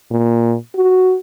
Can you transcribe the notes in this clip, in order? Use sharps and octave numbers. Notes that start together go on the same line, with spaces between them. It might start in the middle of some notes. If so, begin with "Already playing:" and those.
A#2
F#4